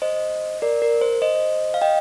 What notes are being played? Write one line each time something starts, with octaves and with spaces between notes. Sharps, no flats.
C5 D#5
A#4 D5
A#4
C5
C5 D#5
F5
D#5 G5